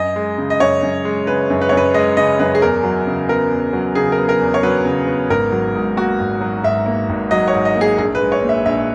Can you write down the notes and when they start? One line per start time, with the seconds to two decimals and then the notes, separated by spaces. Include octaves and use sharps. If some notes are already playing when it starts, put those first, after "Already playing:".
Already playing: F#2 D#5
0.16 G#3
0.38 C#3
0.50 D#5
0.60 F#2 C#5
0.83 F#2
1.05 G#3
1.27 C#3 B4
1.50 F#2
1.61 B4
1.69 F#2 C#5
1.77 B4
1.94 G#3 D#5
2.17 C#3 D#5
2.40 F#2 B4
2.55 G#4
2.62 E2 A#4
2.83 F#3
3.07 C#3
3.29 B3 A#4
3.51 E2
3.73 F#3
3.95 C#3 G#4
4.12 A#4
4.18 B3
4.29 A#4
4.41 E2
4.54 C#5
4.63 F#3 B4
4.85 C#3
5.07 B3
5.30 G#1 A#4
5.52 F#3
5.75 G#2
5.97 A#3 F#4
6.20 G#1
6.41 F#3
6.64 G#2 E5
6.86 A#3
7.09 G#1
7.31 F#3 D#5
7.48 C#5
7.54 G#2
7.65 D#5
7.76 A#3
7.81 G#4
7.98 A#1 G#4
8.15 B4
8.21 G#3
8.32 C#5
8.43 A#2
8.49 E5
8.65 A#1 E5